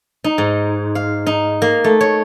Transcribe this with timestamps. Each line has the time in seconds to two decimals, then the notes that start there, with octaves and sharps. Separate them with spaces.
0.24 D#4
0.38 G#2
0.95 F5
1.26 D#4
1.62 A#3
1.84 A3
2.01 C#5